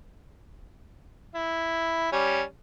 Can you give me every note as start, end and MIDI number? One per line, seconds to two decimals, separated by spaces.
1.35 2.10 64
2.12 2.42 55
2.12 2.42 61